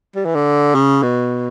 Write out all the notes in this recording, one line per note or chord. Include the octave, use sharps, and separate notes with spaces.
G3
E3
D3
C#3
B2